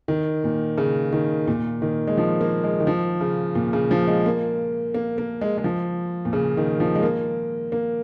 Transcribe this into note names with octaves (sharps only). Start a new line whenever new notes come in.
D#3
A#2
C#3
D#3
A#2
D#3
G#3
F3
A#3
G#3
D#3
F3
C#3
A#2
C#3
F3
G#3
A#3
A#3
A#3
G#3
G#3
F3
A#2
C#3
D#3
F3
G#3
A#3
A#3